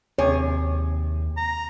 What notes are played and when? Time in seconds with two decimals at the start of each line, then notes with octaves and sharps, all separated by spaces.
0.18 D#2 C3 G#4 C#5
1.37 A#5